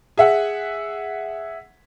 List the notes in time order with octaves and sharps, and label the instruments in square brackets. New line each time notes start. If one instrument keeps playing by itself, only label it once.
[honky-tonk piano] G#4 E5 F#5